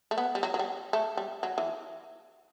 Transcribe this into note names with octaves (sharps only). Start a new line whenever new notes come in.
A3
B3
G3
F#3
F#3
G3
A3
G3
F#3
E3